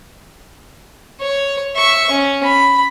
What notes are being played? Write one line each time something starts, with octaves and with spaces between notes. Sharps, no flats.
C#5
E5 C#6
C#4
B5